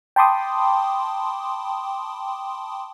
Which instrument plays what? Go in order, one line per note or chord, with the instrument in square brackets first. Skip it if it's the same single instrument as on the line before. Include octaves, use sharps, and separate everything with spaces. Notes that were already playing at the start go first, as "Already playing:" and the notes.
[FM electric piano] G5 A5 B5 C6 D6 D#6